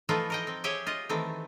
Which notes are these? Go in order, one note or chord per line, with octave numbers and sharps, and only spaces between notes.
E3 F3 A3 D#4 F4
A#4 D#5 G5
C4
G4 G#4 C#5 E5 G5 G#5
F4 D#5
D#3 E3 A3 C4